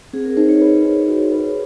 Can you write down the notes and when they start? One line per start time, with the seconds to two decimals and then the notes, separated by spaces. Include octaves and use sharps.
0.13 C4 G#4
0.25 A#4
0.37 D#4 C5
0.49 C#5
0.61 B4
0.85 D#4
1.08 F#4
1.32 B4